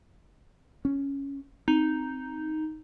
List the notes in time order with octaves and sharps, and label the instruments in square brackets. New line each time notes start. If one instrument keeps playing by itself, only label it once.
[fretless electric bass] C#4
[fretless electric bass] C4 [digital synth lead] D#4